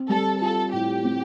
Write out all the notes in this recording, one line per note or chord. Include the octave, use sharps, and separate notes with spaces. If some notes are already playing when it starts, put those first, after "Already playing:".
Already playing: C4
G3 A4
F4 A4
A2 G4
C4